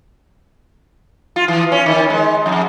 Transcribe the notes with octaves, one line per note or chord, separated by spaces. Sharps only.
F4
E3
C#4
D#3
G#3
F2